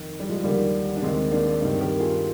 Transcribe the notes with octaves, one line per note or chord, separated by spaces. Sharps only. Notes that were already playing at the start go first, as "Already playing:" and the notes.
Already playing: F2 D#3
G3
F3 G#3
D#2 D3 G3 A#3
D4
D#2 D#3 G#3 C4
A#3 D4
G2 D#3 C4 D#4
G4 A#4
F4 G#4